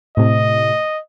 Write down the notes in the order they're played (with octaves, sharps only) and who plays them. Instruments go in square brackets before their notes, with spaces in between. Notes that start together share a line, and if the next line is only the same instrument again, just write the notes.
[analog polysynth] A2 C3 [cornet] D#5